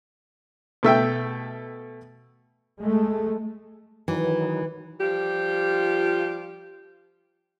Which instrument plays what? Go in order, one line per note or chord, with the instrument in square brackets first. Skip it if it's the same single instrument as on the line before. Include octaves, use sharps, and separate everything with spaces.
[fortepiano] B2 A3 E5 G5
[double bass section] G#3 A3
[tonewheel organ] D#3 F#3 [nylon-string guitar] E3
[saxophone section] F3 G3 F4 G4